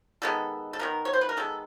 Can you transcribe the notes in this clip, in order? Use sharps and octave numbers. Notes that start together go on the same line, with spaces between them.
D#3 G#3 B3 A4
A4
D#3 G#3 B3 A#4
C#5
C5
B4
A#4
D#3 G#3 B3 A4